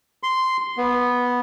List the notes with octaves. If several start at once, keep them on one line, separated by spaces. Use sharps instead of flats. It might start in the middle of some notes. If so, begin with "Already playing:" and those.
C6
B3